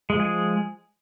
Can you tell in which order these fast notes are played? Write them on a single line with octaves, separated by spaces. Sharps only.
G#3 F3 G#4